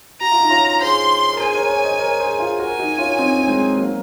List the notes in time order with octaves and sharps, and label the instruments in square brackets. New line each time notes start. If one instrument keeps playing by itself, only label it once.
[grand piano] F#4 [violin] A#5
[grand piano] F4
D#4
C#4 F4
[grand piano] G#4 C5 [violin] C6
[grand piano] A#4
[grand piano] G#4 C5 [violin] G#5
[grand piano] A#4 C#5
A#4 C#5
C5 D#5
A#4 C#5
G#4 C5
F4 G#4
[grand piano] F#4 A#4 [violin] G#5
[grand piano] D#4 F#4
C#4 F4
C4 D#4
C#4
G#3 C4
F#3 A#3